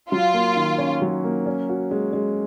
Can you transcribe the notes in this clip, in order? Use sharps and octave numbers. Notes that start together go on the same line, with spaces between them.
F#3 F4
A#3
D#3
C#4
F#3
A#3
C#4
F#4
G#3
G#3